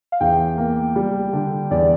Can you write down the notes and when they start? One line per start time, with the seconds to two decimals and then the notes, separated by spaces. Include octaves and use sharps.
0.12 F5
0.20 E2 G5
0.57 A#3
0.96 G3
1.33 D3
1.71 E2 D5